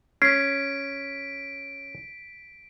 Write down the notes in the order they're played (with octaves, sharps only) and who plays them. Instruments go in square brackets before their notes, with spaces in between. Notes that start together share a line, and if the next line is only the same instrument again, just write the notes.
[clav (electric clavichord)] C#4 [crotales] B6 D7 [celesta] C7